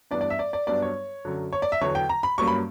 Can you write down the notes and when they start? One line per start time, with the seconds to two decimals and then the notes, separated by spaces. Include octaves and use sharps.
0.11 G2 E3 B3 D4 D5
0.21 D5
0.30 E5
0.39 D5
0.53 D5
0.67 G2 F#3 B3 D4 D5
0.82 C#5
1.25 F#2 D3 F#3
1.53 C#5
1.62 D5
1.72 E5
1.81 E2 D3 F#3 C#5
1.95 G5
2.09 A#5
2.23 B5
2.38 G2 F#3 A#3 C#4 C#6
2.47 B5